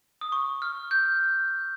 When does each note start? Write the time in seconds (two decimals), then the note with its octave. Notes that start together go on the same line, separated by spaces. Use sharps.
0.21 D#6
0.32 C#6
0.62 F6
0.91 G6